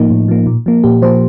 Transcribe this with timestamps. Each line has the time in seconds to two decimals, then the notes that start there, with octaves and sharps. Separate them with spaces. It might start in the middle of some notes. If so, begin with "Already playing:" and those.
Already playing: A2 F3 A#3 D#4
0.11 A2
0.28 F3 A#3
0.47 A#2
0.66 F3 A#3
0.84 A#2 G4
1.02 F3 A#3 C5